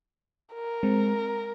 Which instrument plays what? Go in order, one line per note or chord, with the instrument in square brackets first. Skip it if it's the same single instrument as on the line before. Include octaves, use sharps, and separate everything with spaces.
[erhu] A#4
[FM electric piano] G#3 C4